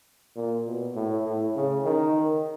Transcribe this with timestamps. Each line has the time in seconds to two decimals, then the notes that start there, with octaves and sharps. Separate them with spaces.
0.36 A#2
0.66 B2
0.95 A2
1.25 A2
1.55 C#3
1.85 D#3